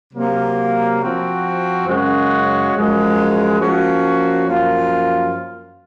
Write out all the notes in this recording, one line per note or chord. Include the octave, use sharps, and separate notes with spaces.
C3 F#3 A#3
F3 C4 F#4
F#2 C#3 G#3 C#4 F#4
F#2 F3 G#3
F3 A#3 C#4 F#4
F#2 F3 A#3 F4